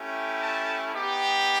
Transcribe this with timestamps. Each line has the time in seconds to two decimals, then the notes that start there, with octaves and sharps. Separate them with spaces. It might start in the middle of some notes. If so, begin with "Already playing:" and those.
Already playing: A3 C#4 E4 G4
0.42 A5
0.93 B3 D#4 G4